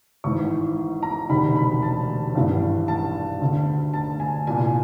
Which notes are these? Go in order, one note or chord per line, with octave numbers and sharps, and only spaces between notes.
G#1 G#2 E3 C#6
A#5
E1 D2 C3 D#3 B5
B5
A5
G#1 G2 E3
A5
D2 D3
A5
G#5
C2 A#2 G#5